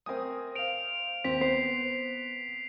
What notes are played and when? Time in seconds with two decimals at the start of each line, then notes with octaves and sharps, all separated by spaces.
0.06 A3 C4 A#4 G#5 D#6
0.56 C5 F5 D7 F7
1.24 D#2 C4 B6
1.41 B3 C5 C7